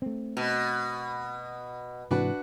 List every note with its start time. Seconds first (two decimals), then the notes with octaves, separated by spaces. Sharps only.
0.02 A3 C4
0.37 B2
2.11 G#2 C3 E3 D4 F#4 B4